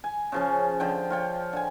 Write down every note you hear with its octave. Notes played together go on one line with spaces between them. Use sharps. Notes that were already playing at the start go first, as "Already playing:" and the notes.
G#5
C#3 F3 C#4
D3 F3 G5
F4 C#5 G5
D3 G#5